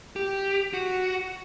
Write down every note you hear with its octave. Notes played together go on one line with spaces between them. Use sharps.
G4
F#4